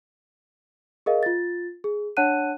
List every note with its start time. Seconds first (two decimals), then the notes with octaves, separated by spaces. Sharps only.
1.06 G#4 A#4 D#5 F5
1.23 F4 A6
1.84 G#4
2.17 D4 C#5 F#5 A5 F#6 D#7